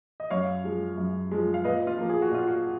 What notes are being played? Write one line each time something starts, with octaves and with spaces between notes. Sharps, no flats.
D#5
F#2 C#5 F5
F3 G#3
F#2
F3 G#3
F5
A#2 B4 D#5
F4
F3 A#3
G#4
F#4
A#2 F4
F#4